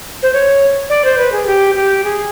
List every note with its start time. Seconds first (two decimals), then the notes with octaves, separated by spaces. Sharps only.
0.22 C5
0.33 C#5
0.89 D5
1.04 C5
1.18 B4
1.32 G#4
1.47 G4
1.75 G4
2.04 G#4